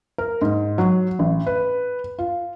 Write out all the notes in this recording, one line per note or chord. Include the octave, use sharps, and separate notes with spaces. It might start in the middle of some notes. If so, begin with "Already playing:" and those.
A#4
G#2
F#3
A1
B4
F4